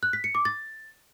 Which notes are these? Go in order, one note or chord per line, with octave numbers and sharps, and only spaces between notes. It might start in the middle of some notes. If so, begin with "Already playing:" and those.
F#6
B6
C#7
D6
A6